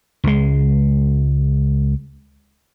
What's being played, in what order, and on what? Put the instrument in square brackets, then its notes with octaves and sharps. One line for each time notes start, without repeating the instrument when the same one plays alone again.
[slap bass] C#2 G#3